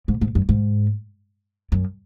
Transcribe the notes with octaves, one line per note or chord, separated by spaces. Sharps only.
G#2
G#2
F#2
G#2
F#2